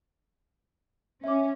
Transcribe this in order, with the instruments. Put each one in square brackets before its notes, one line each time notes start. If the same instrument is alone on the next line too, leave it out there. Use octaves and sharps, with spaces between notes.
[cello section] C#4 [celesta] E5 D6